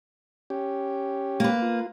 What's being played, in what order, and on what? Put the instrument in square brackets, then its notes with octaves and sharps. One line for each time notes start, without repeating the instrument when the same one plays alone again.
[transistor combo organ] C#4 G4
[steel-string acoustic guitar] A#3 B4
[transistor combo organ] F4